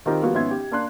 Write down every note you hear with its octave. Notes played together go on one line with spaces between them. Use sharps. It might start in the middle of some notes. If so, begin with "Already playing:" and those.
D#3 C4 D#4 F4 G4 A#4
F3 G3 A#3 B3 F#4
G#1 B3 C#4 E5 C6 G#6
G4
A#3 D4 C6 F#6